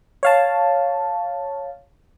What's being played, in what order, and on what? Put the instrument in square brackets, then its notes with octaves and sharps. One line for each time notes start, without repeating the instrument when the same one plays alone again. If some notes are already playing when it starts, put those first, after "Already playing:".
[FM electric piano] C#5 F5 A5